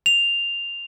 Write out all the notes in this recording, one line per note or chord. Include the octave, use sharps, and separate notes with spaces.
F7